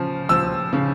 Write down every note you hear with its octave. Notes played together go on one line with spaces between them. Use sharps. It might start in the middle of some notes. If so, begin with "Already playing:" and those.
Already playing: C#3 F3
F3 E6
C#3